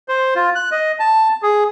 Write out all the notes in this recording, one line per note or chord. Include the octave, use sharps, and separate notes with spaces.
C5
F4
F#6
D#5
A5
G#4